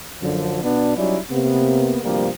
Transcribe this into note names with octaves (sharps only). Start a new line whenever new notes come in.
F#2 D3 F3
B2 B3 D4
F#3 G3 C#4 D#4 E4 D5
C3 A#3 B3
D2 G2 C3 F3 G3 A#3